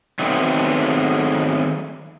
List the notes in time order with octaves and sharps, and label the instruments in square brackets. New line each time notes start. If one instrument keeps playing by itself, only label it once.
[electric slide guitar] D#3 F#3 A3 B3 C4